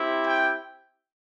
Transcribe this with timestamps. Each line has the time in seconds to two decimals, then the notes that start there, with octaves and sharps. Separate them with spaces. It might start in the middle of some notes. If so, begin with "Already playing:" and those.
Already playing: C4 E4 G4
0.26 G5